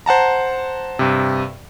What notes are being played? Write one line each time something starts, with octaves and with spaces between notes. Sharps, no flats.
C5 F#5 A5 A#5
G2 C3